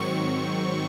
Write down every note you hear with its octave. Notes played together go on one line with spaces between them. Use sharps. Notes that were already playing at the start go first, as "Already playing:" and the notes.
Already playing: G#2 D#3 F#3 C4 C#6